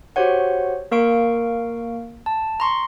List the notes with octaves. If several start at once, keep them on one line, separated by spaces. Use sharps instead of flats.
F#4 G4 C5 C#5 F#5
A#3 A#4 F5 C#6 D7
A5
A#5 C6 C#6